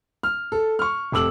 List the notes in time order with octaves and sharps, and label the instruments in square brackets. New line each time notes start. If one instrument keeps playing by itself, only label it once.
[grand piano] F6
A4
C#6 F6
F1 A4 D6 E6 F#7